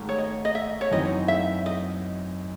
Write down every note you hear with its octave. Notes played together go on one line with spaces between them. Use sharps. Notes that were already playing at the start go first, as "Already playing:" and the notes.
Already playing: G#1 G#2 D#3 A3
C#5
D#5
D#5
E5
C#5
F#2 E3 C4 D#4 F#4 D#5
E5
D#5